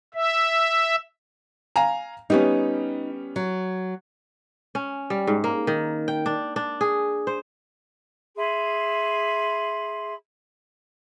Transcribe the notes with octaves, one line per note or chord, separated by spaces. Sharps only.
E5
F5 G#5 A#5
G3 B3 C#4 D#4
F#3
C#4
G3
G#2
A#3
D#3
G5
D4
D4
G#4
C5
G#4 E5 B5 C6